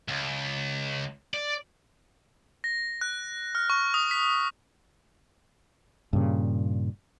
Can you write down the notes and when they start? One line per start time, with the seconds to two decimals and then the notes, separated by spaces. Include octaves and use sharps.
0.08 C#2
1.34 D5
2.64 A#6
3.01 F#6
3.55 F6
3.70 C#6
3.94 D#6
4.11 B6
6.13 G2 A#2 C#3